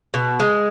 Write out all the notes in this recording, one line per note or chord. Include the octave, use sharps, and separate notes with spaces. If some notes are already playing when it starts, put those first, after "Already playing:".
B2
G#3